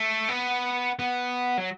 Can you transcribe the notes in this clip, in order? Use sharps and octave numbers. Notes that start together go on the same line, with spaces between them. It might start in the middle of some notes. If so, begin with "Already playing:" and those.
Already playing: A3
B3
B3
F#3